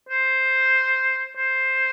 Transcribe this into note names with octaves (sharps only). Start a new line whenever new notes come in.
C5
C5